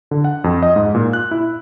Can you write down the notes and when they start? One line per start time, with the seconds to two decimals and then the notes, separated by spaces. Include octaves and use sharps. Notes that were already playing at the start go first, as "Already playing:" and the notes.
0.11 D3
0.24 F#5
0.44 F2
0.63 D#5
0.76 G#2
0.95 A#2
1.13 F#6
1.31 E4